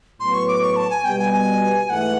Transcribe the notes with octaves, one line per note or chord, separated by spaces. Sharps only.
A2 F#3 B3 C6
C#6
D6
C#6
A5
G#5
B2 G3 B3 G5
G#5
G#5
G#2 E3 A3 F#5